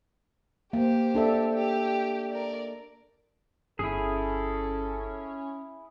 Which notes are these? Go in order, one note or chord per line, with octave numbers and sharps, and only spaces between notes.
A#3 G4 C5
D4 A4 E5
G4
A#4 D5
G1 C#4 E4 G#4 A4